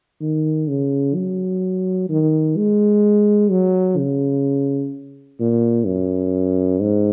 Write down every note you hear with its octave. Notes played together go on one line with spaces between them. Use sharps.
D#3
C#3
F#3
D#3
G#3
F#3
C#3
A#2
F#2
G#2